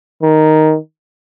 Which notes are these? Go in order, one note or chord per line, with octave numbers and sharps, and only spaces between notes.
D#3